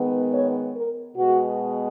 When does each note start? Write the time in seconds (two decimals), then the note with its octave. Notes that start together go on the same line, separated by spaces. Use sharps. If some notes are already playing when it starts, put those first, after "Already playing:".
Already playing: D#3 G#3 B3
0.33 C#5
0.75 A#4
1.15 B2 G#3 B3 F#4